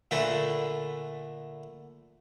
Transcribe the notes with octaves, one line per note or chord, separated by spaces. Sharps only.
A#2 D3 A3 B3